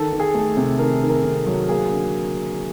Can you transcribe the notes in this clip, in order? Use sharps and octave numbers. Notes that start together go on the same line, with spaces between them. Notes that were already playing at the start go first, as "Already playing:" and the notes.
Already playing: D#3 A4
D#3
G#4
A3
C3
D#3 A#4
D#3
A#4
C3
F#3
A#3 G#4
D3